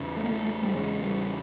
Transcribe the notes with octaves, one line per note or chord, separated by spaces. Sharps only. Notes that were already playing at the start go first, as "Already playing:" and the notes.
Already playing: E2 C#3
A3
A#3
A3
A3
G3
E2 C#3 G#3
G3